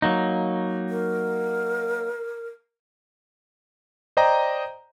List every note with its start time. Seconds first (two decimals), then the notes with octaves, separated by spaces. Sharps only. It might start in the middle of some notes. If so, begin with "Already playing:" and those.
0.02 F#3 A#3 D#4
0.89 A#4
4.17 C5 D5 D#5 G5 A#5